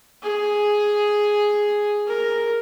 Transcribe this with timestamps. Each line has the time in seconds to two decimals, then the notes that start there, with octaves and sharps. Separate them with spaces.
0.23 G#4
2.07 A#4